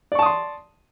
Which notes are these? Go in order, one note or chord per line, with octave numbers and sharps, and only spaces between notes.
D5 A5 C6 C#6 D#6